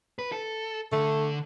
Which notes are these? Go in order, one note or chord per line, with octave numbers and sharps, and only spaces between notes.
B4
A4
D3 A3